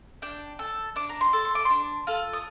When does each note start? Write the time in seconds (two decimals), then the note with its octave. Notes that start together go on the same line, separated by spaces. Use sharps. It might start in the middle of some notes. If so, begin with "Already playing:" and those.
0.22 D4 G5
0.59 A4
0.96 D4 D6
1.09 A#5
1.21 C6
1.33 A4
1.45 C6
1.55 D6
1.65 D4 C6
2.07 F4 A4
2.33 D#6